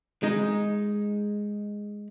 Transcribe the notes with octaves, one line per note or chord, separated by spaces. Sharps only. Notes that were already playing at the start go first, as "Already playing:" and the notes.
G#3 D#4